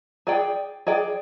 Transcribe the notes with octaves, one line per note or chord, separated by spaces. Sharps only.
G#4 D5 G5
G#4 D5 G5